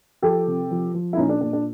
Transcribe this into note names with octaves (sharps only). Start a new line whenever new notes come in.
F3 G4 A4
C3
F3
F3
E4
A#2 C#4 D#4
D4
A#2 D4
D4